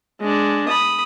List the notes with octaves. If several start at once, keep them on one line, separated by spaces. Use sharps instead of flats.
G#3 D4
B5 D#6